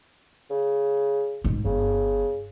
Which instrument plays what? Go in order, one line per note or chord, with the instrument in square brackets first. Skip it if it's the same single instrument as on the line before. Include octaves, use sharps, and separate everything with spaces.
[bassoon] C#3
[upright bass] G#2
[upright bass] G1 [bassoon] C#3